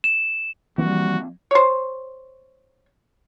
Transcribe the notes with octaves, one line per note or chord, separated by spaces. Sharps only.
E7
E3 F3 G3 A#3 C4 F#4
C5 C#5